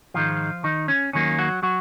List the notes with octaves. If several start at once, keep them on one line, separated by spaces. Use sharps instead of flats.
G#2 D#3 F3 G#3 F4
D#3 D#4
C#4
D#2 D#3 F#3 A#3 C#4
F#3 F#4
F#3 F#4